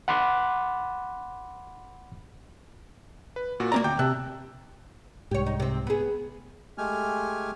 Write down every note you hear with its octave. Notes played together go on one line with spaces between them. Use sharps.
F#5 B5 C6 D6 F#6
B4
A#2 F#4
A#3 C#4 D5 A#5
D2 G5 D6 G6
C3 A5 E6 F#6
C2 G#2 G4 C#5
D#4
C3 C4
B3 G#4
G#3 A3 G4 G#5 F6